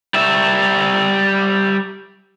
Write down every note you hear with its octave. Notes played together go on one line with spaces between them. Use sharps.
G3 E5